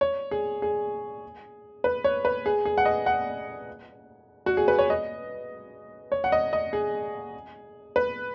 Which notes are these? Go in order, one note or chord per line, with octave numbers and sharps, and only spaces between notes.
C#5
G#4
G#4
B4
C#5
B4
G#4
G#4
F#5
D#5
F#5
F#4
G#4
B4
C#5
D#5
C#5
F#5
D#5
D#5
G#4
B4